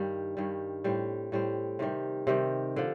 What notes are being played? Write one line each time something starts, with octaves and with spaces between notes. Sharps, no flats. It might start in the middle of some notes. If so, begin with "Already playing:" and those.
Already playing: G2 D#3 G3
G2 D#3 G3
A2 G3 C4
A2 G3 C4
C3 D#3 G3
C3 D#3 G3
D3 F3